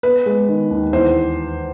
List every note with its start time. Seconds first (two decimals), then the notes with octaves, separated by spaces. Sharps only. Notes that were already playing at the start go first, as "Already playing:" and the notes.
0.03 B3 B4
0.26 G#3
0.49 D#3
0.71 D#2
0.93 E2 C5